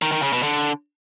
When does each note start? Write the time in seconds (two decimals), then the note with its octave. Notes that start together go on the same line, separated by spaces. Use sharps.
0.02 D#3
0.12 D#3
0.22 C#3
0.33 B2
0.43 D3